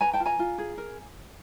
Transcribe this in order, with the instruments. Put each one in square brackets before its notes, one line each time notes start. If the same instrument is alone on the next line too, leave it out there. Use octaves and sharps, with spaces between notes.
[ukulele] B4 G#5 A#5
G5 A5
F4
G#5 A#5
F4
G#4
A#4